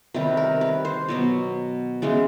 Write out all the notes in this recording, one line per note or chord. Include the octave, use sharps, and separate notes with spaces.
C3 D#3 G3 B4
A#4
B4
C5
B2 F#3 B3
C#3 E3 G#3 B3